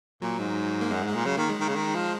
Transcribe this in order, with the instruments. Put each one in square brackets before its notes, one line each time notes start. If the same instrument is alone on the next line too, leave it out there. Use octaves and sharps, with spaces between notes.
[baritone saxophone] A#2 [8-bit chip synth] F#3
[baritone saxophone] G#2
[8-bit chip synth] A#3
[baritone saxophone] F#2 [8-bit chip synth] G#3
[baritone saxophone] G#2
[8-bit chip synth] G#3
[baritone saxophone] A#2
[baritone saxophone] C#3 [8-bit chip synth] F#3
[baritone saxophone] D#3 [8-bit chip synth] A#3
[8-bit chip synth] G#3
[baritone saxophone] D#3
C#3
D#3
F3